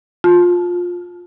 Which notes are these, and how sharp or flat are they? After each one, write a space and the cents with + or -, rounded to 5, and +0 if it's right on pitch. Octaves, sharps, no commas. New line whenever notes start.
F4 +20 A5 -20